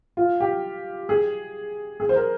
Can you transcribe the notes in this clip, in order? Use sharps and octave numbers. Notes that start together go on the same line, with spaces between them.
F4
G4
G#4
G#4
C5
A#4